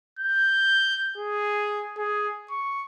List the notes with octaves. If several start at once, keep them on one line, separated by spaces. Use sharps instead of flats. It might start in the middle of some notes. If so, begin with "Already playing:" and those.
G6
G#4
G#4
C#6